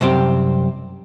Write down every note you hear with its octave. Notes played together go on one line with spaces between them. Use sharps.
C2 F#2 C4 G4